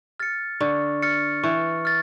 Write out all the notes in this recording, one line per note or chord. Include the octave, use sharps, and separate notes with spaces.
F6 A6 C#7
D3 C#6
F6 A6 C#7
E3 C#6
F6 A6